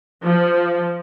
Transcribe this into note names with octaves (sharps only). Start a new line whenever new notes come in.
F3